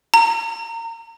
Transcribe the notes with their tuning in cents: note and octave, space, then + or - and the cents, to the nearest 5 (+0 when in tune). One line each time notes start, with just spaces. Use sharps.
A#5 -25